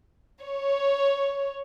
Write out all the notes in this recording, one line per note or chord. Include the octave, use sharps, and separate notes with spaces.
C#5